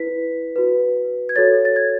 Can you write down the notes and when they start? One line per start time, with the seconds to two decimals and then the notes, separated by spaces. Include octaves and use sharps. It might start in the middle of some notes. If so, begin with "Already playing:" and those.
Already playing: E4 B4 B6
0.56 F#4 B4
1.29 G#6
1.36 F#4 A4 C#5 A6
1.65 A6
1.76 G#6